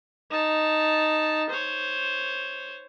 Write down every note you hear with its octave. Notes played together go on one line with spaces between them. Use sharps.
D#4 A5
C5 C#5